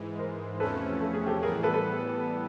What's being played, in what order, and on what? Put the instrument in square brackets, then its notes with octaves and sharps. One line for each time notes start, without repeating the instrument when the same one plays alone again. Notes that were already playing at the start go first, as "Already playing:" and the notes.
Already playing: [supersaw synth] G#2 E3 G#3
[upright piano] A#4 C5
[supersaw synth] E2 C3 F3 A3 C#4 [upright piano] A4 B4
[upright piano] A4
G#4
G4 A4
[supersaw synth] A2 E3 G3 B3 [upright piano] G#4 A#4
[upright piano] A4 B4
A4 B4